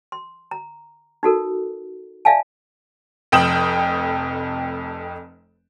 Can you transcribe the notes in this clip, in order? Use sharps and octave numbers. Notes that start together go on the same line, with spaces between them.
C6
A#5
D#4 F#4 A4 A#4
D5 E5 F5 G#5 A5
F1 F2 G5 D#6 E7 F#7